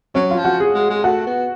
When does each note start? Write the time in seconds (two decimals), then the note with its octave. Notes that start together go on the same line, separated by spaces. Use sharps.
0.15 F#3 C#4
0.31 F4
0.38 F3
0.45 F#4
0.60 G#4
0.75 G#3
0.90 G#3
1.04 A3 F#4
1.27 B3